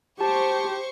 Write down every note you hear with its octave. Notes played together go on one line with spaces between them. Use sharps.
G4 C5 A5 C#6